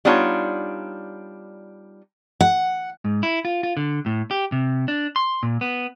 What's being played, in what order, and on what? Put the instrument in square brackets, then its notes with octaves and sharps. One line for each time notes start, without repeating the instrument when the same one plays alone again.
[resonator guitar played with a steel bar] G3 B3 D4 D#4 F4 C#5
[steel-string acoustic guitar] F#5
[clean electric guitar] G#2
E4
F4
F4
D3
A2
G4
C3
D4
C6
A#2
B3